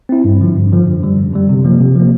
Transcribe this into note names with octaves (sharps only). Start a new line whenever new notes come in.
C4 E4
G2
D3 F3
G2
D3 F3
F#2
D3 G3
F#2
D3 G3
C3
F3 A#3
C3
F3 A#3